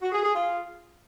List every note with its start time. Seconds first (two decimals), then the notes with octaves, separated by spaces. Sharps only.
0.01 F#4
0.12 G#4
0.23 G#4
0.35 F4